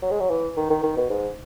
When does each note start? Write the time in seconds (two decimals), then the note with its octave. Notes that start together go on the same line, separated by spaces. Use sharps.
0.03 F#3
0.11 G#3
0.20 F#3
0.30 E3
0.57 D#3
0.70 D#3
0.83 D#3
0.97 B2
1.10 G#2